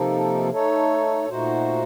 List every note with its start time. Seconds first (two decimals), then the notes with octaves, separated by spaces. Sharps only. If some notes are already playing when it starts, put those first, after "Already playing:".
Already playing: C3 F3 A#3 D#4 A4
0.49 A3 D#4 A4 C#5
1.29 A#2 A3 D#4 F#4 C5